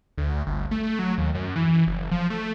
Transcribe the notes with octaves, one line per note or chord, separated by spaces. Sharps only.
D2
G1
A3
F#3
D#2
F#2
E3
F#1
F3
A3